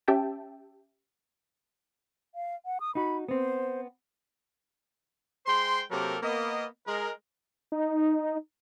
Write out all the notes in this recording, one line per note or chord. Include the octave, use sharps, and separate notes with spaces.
C#4 G4 E5 G5 A5
F5
F#5
D#6
D#4 F#4 B5
B3 C4 C5
G#3 C5 G5 C6
C3 F#3 A#3 G4 A4 A#4
A#3 B3 D#5
G#3 A#4
D#4